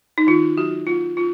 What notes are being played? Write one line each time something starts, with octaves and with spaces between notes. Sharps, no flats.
D#4
D#3 F4
F#3 F#4
A#3 F4
C#4 F4